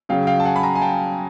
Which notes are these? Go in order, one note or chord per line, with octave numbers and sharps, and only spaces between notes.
C#3 F#3 F5 G5
F5 G5
A5
F#5 G#5
B5
G#5 A#5
G#5
G5 A5